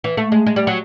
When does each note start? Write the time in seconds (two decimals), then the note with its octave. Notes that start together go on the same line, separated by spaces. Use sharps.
0.04 E3
0.17 A3
0.32 G#3
0.47 G#3
0.56 G3
0.67 F#3